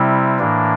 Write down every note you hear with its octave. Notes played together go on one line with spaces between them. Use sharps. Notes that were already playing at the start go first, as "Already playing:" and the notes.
Already playing: C3 G3 C4 E4
A2 E3 A#3 D4